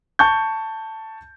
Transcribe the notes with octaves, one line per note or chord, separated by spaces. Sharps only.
A5 C#6 G6